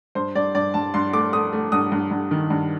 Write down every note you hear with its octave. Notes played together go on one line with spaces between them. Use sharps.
G2 C5
G2 D5
G2 D5
G2 A5
G2 C6
A3 D6
A3 D#6
A3
G2 D#6
G2
G2
D#3
G2